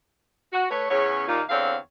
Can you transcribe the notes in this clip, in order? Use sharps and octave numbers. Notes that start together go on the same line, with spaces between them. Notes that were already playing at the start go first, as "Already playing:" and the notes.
F#4
A3 B4 C#5
E2 C#3 C#4 C#5
D#2 A#2 A#3 D#4 F4
E2 D3 C4 C#5 F5